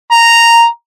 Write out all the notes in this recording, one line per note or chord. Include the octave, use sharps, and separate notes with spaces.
A#5